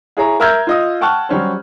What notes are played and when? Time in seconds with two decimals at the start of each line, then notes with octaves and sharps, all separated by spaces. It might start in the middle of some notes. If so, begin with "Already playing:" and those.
0.17 E4 G#4 C#5 A#5
0.40 A#4 E5 E6 F6 G6 G#6
0.67 F4 D#5 D#6
1.01 F#5 G5 A5 C#6 F6 F#6
1.29 F#3 G3 C#4 C5